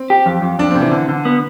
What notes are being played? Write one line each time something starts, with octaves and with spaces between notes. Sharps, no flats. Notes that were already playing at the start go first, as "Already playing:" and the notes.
Already playing: C4
G4
F2
F2
F2 D4
C4
C3
E3
D3
D3
B3